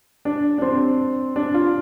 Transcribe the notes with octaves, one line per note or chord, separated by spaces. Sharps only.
D4
D4
C4
D4
F4